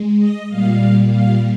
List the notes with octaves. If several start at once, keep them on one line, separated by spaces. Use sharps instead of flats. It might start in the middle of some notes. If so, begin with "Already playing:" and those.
Already playing: G#3
D#5
A#2 G3 F5
F5